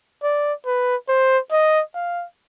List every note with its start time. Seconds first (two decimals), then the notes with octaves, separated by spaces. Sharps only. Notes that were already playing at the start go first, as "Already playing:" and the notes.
0.23 D5
0.66 B4
1.09 C5
1.52 D#5
1.95 F5